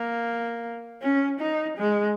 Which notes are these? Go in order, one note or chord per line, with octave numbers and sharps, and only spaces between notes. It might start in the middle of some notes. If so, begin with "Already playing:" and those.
Already playing: A#3
C#4
D#4
G#3